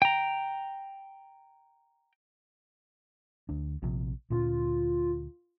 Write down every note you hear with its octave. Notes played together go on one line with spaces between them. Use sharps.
G5 A#5
D2 D4
A#1 C3 F3
D2 A#2 C#4 F4